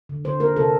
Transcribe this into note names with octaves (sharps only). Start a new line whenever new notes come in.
D3
D3 C5
A#3 A#4
C3 A4